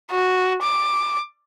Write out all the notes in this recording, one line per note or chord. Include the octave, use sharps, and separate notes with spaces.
F#4
D6